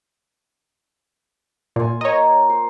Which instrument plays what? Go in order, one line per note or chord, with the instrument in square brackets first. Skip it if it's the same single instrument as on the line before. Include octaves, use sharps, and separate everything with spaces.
[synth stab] A#2 [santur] F4 G#5
[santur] A#3 A#5 [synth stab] C#5 D#5
[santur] C5